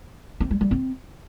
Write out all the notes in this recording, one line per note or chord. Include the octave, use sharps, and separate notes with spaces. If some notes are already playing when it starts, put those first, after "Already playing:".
C4
G3
G3
C4